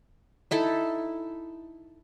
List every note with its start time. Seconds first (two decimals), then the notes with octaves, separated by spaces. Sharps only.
0.51 D#4 E4 A4